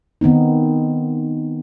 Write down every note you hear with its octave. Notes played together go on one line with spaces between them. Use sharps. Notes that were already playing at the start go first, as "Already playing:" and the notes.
D#3 B3 C4 D#4